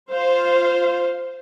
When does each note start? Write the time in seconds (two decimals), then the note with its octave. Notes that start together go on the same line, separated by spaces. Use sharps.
0.10 F4 C5 F5